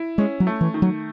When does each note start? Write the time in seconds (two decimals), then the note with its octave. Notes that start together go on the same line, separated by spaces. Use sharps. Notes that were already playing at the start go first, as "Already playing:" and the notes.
Already playing: E4
0.18 G#3 C#4
0.40 F#3
0.47 A3
0.61 E3
0.74 D#3
0.82 F#3